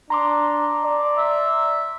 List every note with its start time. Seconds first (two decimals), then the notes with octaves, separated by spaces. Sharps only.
0.10 D4 A#5 C6 D6
0.84 D5
1.18 E5